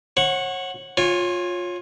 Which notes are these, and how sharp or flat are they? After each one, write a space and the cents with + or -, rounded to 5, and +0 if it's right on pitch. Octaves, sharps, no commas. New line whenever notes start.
C#5 -35 F#5 -5 C#6 +0
F4 +20 C#5 -10 G#5 -45